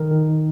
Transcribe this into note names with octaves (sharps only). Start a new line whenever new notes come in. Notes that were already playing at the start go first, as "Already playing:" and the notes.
Already playing: D#3 A#4
D#3